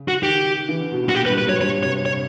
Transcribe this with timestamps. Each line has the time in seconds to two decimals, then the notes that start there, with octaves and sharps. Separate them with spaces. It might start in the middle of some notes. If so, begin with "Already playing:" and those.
Already playing: C#3
0.08 F#4
0.23 D#3 G4
0.69 E3
0.80 D3
0.92 B2
1.03 A#2
1.09 F#4
1.14 A#2 G4
1.26 B4
1.30 G2
1.38 B4
1.45 F#2 C#5
1.61 G2 C#5
1.83 C3 C#5
2.06 C#5